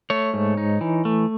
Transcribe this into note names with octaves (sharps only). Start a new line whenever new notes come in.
A3 C#5
G#2
D#4
E3
A3